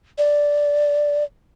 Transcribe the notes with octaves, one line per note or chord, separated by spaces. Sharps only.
D5